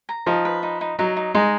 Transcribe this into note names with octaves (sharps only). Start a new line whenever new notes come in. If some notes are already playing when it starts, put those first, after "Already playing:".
A#5
F3 D#4
B4
D#4
D#4
F#3 D#4
D#4
G#3 D#4